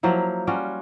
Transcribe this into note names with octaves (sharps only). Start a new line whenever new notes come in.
F3 F#3 A#3 E4
G3 C#4 F4 F#4